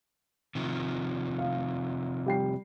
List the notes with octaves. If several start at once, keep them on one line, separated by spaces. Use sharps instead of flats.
C3 D#3 F3
F5
G3 G5 C7